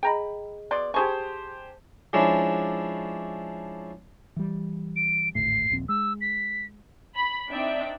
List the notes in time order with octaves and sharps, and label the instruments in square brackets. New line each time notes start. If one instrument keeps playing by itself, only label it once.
[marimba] G#4 D#5 [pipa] G5 A#5 B5
[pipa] B2 D5 C6
[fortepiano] G4 C5 G#5 [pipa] G#4 C#6 [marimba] A5
[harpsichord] F3 G#3 C#4 D4 E4
[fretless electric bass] E3 G3
[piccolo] D7
[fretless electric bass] G#1 D2 A2 [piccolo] C7
[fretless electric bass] D#1 A#1 C4
[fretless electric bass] G#3 [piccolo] E6
[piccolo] B6
[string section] B5
C4 D4 D#4 D5 E5 G5